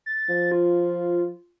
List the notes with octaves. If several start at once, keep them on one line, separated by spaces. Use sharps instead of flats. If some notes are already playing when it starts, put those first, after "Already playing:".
A6
F3
F4